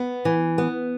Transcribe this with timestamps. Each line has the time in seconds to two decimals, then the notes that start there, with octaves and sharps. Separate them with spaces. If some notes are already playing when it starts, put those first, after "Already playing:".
Already playing: B3
0.25 E3
0.58 B3